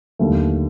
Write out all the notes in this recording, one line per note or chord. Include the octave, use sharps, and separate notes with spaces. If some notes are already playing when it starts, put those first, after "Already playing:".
D#2 D3 F#3 A3